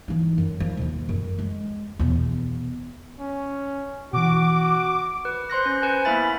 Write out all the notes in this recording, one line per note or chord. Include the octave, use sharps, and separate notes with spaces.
E3 D#4
F#2
F3
D#2 B2
F#2
G#3
E2 B2
C#4
B2 E3 F#4 D6
B4
C5 C6 F#6 A#6
C#4
B4 G#5
A#3 B3 E4 E5 B5 A6